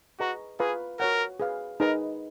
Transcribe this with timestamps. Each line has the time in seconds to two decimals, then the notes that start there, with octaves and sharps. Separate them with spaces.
0.20 F#4 G#4 B4 D#5 A#5 C#6
0.60 F4 G#4 B4 F5 A#5 C#6
1.00 F#4 A#4 C#5 F#5
1.40 G#4 B4 F5
1.80 D#4 G#4 A#4 B4 D#5